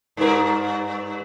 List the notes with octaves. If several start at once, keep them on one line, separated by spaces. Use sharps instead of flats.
G2 A#4